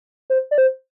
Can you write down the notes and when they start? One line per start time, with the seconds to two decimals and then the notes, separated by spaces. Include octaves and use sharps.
0.30 C5
0.51 D5
0.58 C5